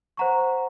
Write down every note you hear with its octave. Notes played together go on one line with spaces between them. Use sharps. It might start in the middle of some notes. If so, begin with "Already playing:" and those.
C5 F#5 A#5 C#6